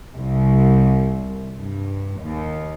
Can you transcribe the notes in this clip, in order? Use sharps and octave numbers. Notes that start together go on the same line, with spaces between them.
C2
G2
D#2